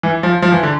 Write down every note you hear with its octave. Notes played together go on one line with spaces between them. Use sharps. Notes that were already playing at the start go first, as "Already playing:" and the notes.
E3
F3
F3
E3
D3